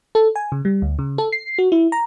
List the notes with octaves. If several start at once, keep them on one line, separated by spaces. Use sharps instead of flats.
A4
G#5
C#3
G3
D2
C#3
A4
C7
F#4
E4
A#5